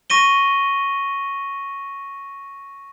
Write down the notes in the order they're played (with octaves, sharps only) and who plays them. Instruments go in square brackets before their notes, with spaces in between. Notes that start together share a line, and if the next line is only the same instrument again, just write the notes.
[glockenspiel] C#6 A#6 D#7 G7